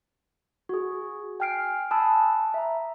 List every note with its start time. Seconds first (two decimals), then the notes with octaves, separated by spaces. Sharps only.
0.69 F#4 G#4
1.40 G5 G#5 F6 C7 D7
1.91 G#5 A5 B5 D#6 E6 F#6
2.54 E5 A#5